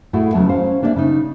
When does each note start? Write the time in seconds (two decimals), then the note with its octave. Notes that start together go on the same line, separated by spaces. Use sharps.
0.13 A2 A3 E4 F#4 G#4 A4
0.34 E2 C#3 F#3 G#3 A5
0.49 C#4 C5 F5
0.82 A#3 D4 G4 A#4 D5 E5
0.96 C#3 D#4